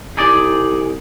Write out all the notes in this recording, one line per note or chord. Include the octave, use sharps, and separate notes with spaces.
C2 D#4 G#4 D5